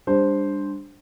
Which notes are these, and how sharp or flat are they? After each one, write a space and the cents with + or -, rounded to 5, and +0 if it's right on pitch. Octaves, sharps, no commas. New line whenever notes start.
G3 +30 D4 +0 C5 +0